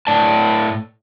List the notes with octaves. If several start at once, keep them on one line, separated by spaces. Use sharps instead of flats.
A2 D5 A5